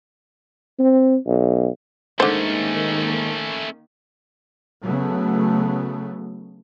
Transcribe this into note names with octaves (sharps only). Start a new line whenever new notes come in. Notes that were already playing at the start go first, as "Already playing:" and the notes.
C4
B1
G#2 D3 D#3 A3 A#3 C#4 C5
C#3 F#3 A3 B3